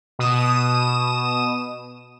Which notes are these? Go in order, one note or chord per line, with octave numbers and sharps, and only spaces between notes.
B2 D#6 D#7 E7